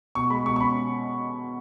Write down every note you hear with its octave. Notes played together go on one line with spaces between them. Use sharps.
B2 C#6
G#3 B5
B2 C#6
C#6
C#4 B5